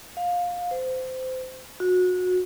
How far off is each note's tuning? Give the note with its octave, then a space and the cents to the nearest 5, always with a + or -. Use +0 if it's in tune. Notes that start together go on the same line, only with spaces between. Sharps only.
F5 +20
C5 -20
F#4 -25